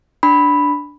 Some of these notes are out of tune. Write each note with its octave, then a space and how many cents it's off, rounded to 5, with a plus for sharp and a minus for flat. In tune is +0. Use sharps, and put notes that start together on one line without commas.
D4 +0 B5 +0